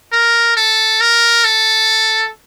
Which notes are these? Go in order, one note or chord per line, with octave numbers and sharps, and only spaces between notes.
A#4
A4
A#4
A4